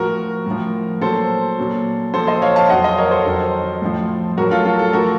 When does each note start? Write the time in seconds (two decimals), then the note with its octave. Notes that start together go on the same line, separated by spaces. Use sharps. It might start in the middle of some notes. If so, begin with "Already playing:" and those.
Already playing: A2 F3 F#4 A#4
0.46 A2 F3
1.01 A#2 F#3 A4 C5
1.58 A#2 F#3
2.14 A#2 F3 A4 C5
2.27 C5 D#5
2.42 C#5 F5
2.56 F5 A5
2.70 F2 D#3 F#3 D#5 F#5
2.84 C5 D#5
2.98 A#4 C#5
3.11 A4 C5
3.25 F2 D#3 F#3
3.82 A2 F3
4.37 A2 F#3 F#4 A#4
4.51 F4 A4
4.65 F4 A4
4.79 F4 A4
4.93 A2 F3 F#4 A#4